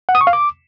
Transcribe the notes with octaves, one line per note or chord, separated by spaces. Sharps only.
F#5
D#6
C#6
F5
D6